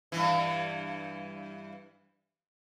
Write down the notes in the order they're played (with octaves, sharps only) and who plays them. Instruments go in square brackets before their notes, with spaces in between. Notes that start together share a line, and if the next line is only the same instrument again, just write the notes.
[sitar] G2 E3